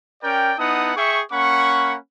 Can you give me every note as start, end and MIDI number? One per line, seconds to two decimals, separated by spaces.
0.23 0.53 61
0.23 0.53 70
0.23 0.53 74
0.23 0.53 79
0.59 0.92 59
0.59 0.92 63
0.59 0.92 64
0.59 0.92 78
0.59 0.92 81
0.59 0.92 87
0.97 1.21 68
0.97 1.21 76
0.97 1.21 79
0.97 1.21 85
1.32 1.95 58
1.32 1.95 61
1.32 1.95 78
1.32 1.95 83
1.32 1.95 85